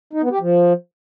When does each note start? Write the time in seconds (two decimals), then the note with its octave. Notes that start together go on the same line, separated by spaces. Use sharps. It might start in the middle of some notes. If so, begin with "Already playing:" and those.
0.13 D#4
0.22 B3
0.31 G4
0.40 F3